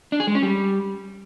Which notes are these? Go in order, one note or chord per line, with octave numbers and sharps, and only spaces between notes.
D4
G#4
G#3
C#4
G3